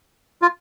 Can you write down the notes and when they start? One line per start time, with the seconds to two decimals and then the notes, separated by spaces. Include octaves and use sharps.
0.42 F4